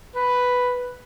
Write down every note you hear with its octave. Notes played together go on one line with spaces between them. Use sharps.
B4